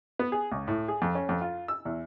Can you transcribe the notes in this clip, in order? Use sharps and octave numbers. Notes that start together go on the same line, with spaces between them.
B3
G#4
C#2
A2
G#4
F2
C#4
F2
F4
E6
E2